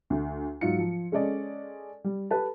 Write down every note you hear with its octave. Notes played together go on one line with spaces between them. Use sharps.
D2
G#2 F#3 D#4 F4 C#7
F3
G#3 C#4 A4 D5 D#5
G3
G4 A4 B4 A5